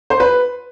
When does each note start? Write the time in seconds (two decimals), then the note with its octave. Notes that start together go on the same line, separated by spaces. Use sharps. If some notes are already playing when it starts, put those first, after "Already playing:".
0.10 C5
0.20 B4